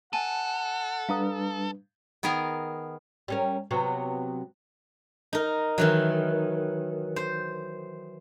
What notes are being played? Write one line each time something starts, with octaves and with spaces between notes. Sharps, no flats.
A4 F#5 G#5 A5 D#7
G3 D4 B4 F5 A#5 D#6
D#3 B3 G#4 A#4
G3 C#4 A#4
C3 F#3 B3
D#4 A#4
D#3 E3 F#3
C5